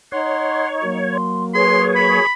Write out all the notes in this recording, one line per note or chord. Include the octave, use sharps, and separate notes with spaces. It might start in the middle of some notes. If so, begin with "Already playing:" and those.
D#4 C#5 F#5 C6
F#3 A#3
C6
G#4 B4 C#5 C6
B5